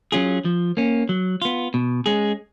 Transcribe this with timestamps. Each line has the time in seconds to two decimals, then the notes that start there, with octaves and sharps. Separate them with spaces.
0.12 F#3 C#4 F4 G#4
0.45 F3
0.77 A#3 C#4
1.09 F#3
1.42 B3 F4
1.74 B2
2.06 G#3 C#4 G#4